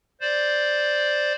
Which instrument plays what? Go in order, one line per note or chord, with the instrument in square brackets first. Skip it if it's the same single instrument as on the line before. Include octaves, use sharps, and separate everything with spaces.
[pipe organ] C5 D5